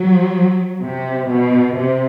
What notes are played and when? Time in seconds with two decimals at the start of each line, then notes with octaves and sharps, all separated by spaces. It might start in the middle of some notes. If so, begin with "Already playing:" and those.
Already playing: F#3
0.82 C3
1.29 B2
1.76 C3